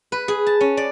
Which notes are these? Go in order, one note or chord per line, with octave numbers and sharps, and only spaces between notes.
B4
G#4
A5
C#4
D5